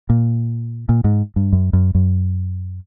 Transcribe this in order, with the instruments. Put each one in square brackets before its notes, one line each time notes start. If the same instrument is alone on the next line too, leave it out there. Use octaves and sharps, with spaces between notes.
[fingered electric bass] A#2
A#2
G#2
G2
F#2
F#2
F#2